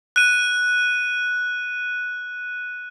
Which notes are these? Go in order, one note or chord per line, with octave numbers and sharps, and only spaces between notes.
F#6 D#7